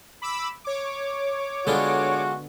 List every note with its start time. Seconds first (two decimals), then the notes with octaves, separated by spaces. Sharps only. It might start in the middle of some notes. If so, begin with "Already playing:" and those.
0.22 B5 D6 E6
0.64 C#5 D6
1.67 D3 G#3 B3 D4 F4 F#4 A4